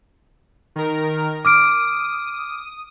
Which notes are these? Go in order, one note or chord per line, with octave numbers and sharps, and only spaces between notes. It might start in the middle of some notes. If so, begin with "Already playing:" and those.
D#3 A#4
D6 D#6 F6 D7